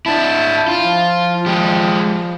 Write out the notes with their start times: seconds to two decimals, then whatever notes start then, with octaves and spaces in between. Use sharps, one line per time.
0.06 D4 E4 A5
0.68 F4
0.84 F3
1.46 G#3 G4